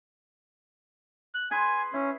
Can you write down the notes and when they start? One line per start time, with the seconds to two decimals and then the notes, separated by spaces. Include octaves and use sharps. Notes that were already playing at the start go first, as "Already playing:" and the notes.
1.35 F#6
1.51 G#4 B4 G#5 C6
1.94 C#4 E4